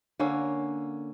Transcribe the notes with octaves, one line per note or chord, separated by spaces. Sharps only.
D3 A#3 C#4